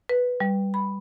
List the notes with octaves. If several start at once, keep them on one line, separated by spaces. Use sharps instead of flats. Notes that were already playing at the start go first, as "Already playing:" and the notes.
B4
G3
B5